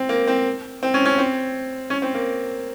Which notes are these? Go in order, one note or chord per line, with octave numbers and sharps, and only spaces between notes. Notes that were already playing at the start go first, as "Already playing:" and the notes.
Already playing: C4
A#3
C4
C4
C#4
C#4
C4
C#4
C4
A#3